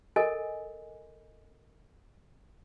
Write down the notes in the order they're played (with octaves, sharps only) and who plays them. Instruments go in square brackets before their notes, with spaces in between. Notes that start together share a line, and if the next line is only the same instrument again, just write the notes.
[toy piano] A4 A#4 D#5 G#5